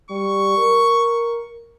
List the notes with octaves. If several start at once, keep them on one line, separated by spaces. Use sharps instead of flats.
G3 C#6
A#4